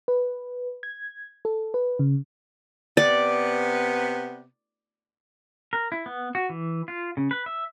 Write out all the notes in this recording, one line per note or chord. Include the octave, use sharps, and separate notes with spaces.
B4
G#6
A4
B4
C#3
C3 B3 D5
A#4
E4
B3
F#4
E3
F4
C#3
B4
E5